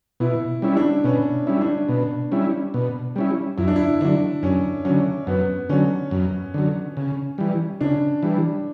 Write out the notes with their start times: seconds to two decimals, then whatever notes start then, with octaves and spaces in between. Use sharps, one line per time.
0.20 B2 E4
0.62 G3 C#4 E4
0.77 D4
1.04 B2 C#4
1.47 G3 C#4 E4
1.61 D4
1.89 B2
2.31 G3 C#4 E4
2.74 B2
3.16 G3 C#4 E4
3.58 F#2 E4
3.68 D4
3.76 E4
4.01 D3 F#3 D4
4.43 F#2 C#4
4.85 D3 F#3 C#4
5.27 F#2 B3
5.69 D3 F#3 C#4
6.11 F#2
6.54 D3 F#3
6.97 C#3
7.38 E3 G3
7.81 C#3 D4
8.23 E3 G3